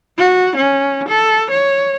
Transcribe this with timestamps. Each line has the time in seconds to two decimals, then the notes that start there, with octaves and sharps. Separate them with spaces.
0.18 F#4
0.56 C#4
1.09 A4
1.51 C#5